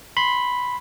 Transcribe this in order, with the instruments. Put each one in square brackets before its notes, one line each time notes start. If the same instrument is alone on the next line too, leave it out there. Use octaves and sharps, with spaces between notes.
[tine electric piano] B5 C6